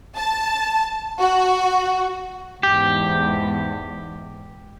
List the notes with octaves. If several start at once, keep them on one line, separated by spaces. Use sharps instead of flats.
A5
F#4
E2 G#2 G4